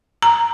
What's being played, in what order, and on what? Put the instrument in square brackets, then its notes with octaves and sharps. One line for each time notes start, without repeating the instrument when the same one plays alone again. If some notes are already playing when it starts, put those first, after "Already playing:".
[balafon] A#5